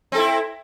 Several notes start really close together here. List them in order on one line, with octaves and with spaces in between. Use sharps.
C4 A4 E4